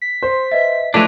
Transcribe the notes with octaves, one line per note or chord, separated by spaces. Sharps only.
B6
C5 C6
B4 D#5 E5
E3 F3 G#3 A3 D4 D6 B6